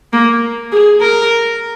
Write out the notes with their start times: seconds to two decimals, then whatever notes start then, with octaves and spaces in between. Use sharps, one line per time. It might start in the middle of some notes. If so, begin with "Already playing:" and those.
0.13 A#3
0.72 G#4
1.01 A#4